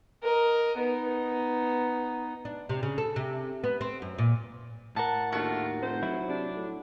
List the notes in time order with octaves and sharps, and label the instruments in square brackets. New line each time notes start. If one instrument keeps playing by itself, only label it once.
[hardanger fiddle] A#4 D#5
B3 D#4
[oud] D4
C3
C#3
A4
C3
B3
C4
F#2
A#2
[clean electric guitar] A2 A#4 [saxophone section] F#5 [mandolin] A5
[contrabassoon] D#2 [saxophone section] A3 D4 F4 [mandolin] F#4
[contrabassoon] F1 [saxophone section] C5
[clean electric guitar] F#3 E4
[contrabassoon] C3 [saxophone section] D4
[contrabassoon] A2